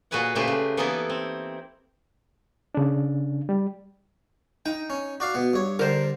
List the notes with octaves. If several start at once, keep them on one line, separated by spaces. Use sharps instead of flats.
A#2 F#4 G#4 B4 C#5 F#5
A#2 C#3 A3 G4 B4 C5
C#3
E3 A#3 B3 D#4 E4 A4
C4
C#3 D4
G3
D#4 G5
C#4
F#4 D5 F5
B2 B3
G2 C#5
D3 G3 A#4 C5